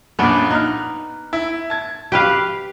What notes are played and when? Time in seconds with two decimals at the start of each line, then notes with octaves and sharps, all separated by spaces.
0.19 F#2 A#2 B3 D4 D5
0.51 D#4 F6 F#6
1.33 E4
1.70 A5 G#6
2.12 G4 B4 F5 D7